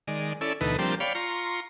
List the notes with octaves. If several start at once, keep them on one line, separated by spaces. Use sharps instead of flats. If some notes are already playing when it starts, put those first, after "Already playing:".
D#3 G#3 D5
C#4 E4 A4 D5
D2 B2 E3 D#4 A4 B4
F3 G3 A#3 C4 D4 G4
C#5 D5 F5 G5 B5
F4 A#5 C6 C#6